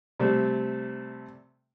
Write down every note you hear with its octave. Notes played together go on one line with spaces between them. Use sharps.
C3 G3 A3